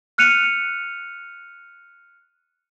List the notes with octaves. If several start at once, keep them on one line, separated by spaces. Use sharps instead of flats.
F6 F#6 C#7 D#7 F7